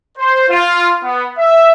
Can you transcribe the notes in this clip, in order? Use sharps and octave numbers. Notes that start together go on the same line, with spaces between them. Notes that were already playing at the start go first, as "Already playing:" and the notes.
C5
F4
B3
E5